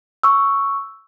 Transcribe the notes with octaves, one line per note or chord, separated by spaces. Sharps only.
C#6 E6